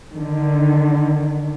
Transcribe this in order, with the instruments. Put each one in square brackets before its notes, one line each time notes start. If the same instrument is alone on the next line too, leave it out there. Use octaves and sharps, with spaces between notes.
[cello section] D3 D#3